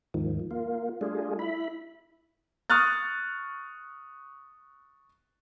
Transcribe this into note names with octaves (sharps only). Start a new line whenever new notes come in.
D#2 G#2 D#3 F3
A#3 F4
G3 A3 D4 F4 G#4
E4 B5
C#6 D#6 F6 F#6 A6